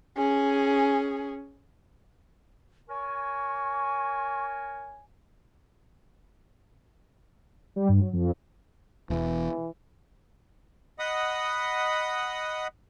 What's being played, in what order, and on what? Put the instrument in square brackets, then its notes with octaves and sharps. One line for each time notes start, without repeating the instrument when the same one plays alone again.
[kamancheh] C#4 G#4
[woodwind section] A#4 C#5 G#5 [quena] C#6
[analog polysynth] G3
G2
F#3
F2
[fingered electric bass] E1 E2 [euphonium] E3
[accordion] D#5 F#5 B5 D#6